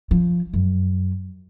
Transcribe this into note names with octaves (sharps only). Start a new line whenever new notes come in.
F3
F#2